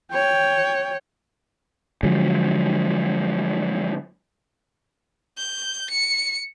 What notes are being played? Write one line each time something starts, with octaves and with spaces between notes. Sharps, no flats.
C#5 G5
D3 F3 F#3 G#3
G6
C#7